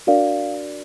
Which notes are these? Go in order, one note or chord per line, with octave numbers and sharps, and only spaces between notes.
D4 F#4 A#4 D5 F5